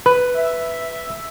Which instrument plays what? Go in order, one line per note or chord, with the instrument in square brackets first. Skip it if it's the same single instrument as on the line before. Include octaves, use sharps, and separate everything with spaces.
[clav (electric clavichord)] B4
[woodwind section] E5